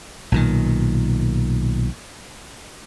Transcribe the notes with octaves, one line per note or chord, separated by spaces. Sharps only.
B1 A#2 D#3